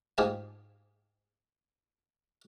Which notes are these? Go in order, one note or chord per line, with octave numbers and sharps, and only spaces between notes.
G#2 F4 G4 G#4 G#5 A5